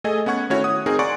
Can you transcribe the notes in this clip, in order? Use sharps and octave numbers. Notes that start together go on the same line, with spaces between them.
A3 G#4 A4 D#5 G#5
B3 C#4 F#5 C#6 G#6
D#3 A3 C#4 E4 F#4 C#5
F#5 D#6
C4 D#4 G#4 A#4
D5 F#5 G#5 A#5 C6 C#6